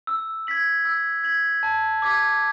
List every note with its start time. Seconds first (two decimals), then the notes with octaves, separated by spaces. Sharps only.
0.07 E6
0.47 G#6 B6 F#7
0.85 E6
1.24 G#6 B6 F#7
1.63 A5
2.02 D6 G#6 B6